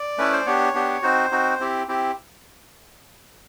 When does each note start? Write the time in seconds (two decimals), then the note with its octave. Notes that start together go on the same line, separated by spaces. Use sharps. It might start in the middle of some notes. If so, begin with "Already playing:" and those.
Already playing: D5
0.18 A3 C#4 E4 B4
0.33 C5
0.46 B3 D4 G4 C#5
0.74 B3 D4 G4
1.02 C4 D#4 F#4 C5
1.32 C4 D#4 F#4
1.60 C4 E4 G4
1.88 C4 E4 G4